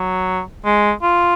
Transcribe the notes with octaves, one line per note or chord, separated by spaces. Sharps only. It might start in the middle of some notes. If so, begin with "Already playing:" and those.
Already playing: F#3
G#3
F4